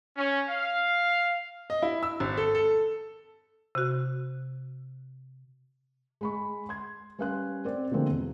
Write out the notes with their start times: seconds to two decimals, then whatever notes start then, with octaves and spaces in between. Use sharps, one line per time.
0.17 C#4
0.49 F5
1.70 D#5
1.82 E4
2.03 E6
2.20 G#1
2.37 A4
2.55 A4
3.75 C3 F#4
6.21 G#3 B5 C#6
6.69 C6 G#6
7.19 G3 C#4 B4 F5 C6 F#6
7.65 C4 D5
7.91 B2 D3 F3 G#3 A#3 C4
8.10 E2